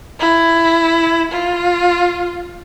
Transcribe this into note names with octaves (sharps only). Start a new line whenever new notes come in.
E4
F4